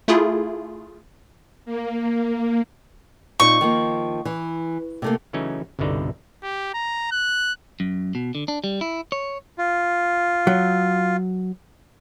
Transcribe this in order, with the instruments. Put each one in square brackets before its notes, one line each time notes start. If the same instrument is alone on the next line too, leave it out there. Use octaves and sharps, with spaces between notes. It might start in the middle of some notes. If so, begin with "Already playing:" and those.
[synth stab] A3 E4 F4 G#4
[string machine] A#3
[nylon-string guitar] A#2 C4 D#4 [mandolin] C#6
[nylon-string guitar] D#3 F3 A#3
E3
C3 A3 A#3
[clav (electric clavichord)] C#3 E3 F#3 A3 C#4 D#4
G1 C2 B2 D3 D#4 D5
[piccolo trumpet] G4
A#5
F#6
[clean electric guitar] F#2
B2
D3
D4
G3
E4
C#5
[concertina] F4
[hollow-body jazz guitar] F#3